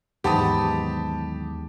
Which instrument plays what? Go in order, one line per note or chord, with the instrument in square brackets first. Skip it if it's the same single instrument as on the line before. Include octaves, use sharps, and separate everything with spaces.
[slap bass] D#2 E3 F#3 [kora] G#2 B3 [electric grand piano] G4 A5 D#6